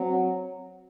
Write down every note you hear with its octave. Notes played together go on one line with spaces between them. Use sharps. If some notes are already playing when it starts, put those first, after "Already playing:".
Already playing: F#3 C4